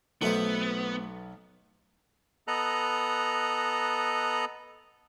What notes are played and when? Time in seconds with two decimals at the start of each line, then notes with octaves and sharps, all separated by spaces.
0.22 B1 A3 B3 C5
2.48 B3 A4 D#5 A#5 F#6